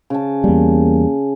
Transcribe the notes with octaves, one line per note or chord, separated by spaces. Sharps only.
C#3 A5
E2 G3 A#3